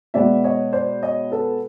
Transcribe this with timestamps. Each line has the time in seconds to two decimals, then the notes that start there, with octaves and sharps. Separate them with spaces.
0.14 B2 G#3 B3 D5 E5
0.44 C#5 D#5
0.73 C5 D5
1.03 C#5 D#5
1.32 A4 B4